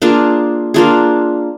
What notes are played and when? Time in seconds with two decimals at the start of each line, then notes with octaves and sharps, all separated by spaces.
0.02 A#3 D4 F4 G#4
0.74 A#3 D4 F4 G#4